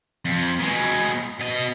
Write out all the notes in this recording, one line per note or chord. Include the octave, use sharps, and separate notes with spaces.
F2
B2 G#3
B2 D#5